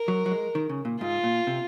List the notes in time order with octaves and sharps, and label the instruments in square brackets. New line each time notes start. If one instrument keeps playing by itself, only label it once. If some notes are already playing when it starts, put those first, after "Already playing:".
Already playing: [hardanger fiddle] A#4
[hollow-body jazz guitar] F#3
F#3
G#3
D#3
C#3
A#2
[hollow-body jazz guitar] G#2 [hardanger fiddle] F4
[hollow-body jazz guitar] A#2
C3